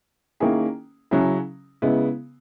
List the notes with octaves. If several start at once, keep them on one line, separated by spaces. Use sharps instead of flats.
D#3 A#3 C#4 E4 G#4
C#3 F#3 C#4 E4 G#4
C#3 G#3 B3 E4